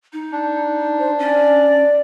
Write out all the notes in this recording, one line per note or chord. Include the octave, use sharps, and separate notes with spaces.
D#4
D4
C5
C#4 D5